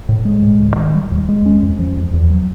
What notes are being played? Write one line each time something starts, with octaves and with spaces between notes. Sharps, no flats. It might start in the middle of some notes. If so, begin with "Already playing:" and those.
A2
G#3
A2
D2
D#3
G3
D#2
G#3
C#4
F2
F3
F2
E2
F#3